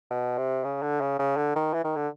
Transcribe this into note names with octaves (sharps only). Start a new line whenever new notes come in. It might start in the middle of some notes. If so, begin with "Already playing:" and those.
B2
C3
C#3
D3
C#3
C#3
D3
D#3
E3
D#3
D3